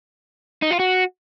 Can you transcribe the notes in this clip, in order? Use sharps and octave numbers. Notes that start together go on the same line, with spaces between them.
D#4
F4
F#4